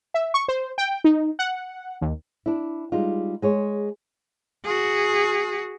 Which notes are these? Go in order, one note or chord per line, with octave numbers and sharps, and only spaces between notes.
E5
C#6
C5
G5
D#4
F#5
D#2
D4 E4
G3 G#3 D#4 F4
G#3 G#4 C#5
F#4 G#4